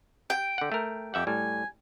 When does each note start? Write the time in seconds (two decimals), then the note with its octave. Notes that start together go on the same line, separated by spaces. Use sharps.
0.30 G5
0.58 D3 F#5
0.72 A3 A#4
1.14 F2 G4 E5 F#5
1.27 A2 G3 G#5